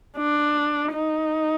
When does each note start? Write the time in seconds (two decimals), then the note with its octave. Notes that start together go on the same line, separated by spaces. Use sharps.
0.17 D4
0.92 D#4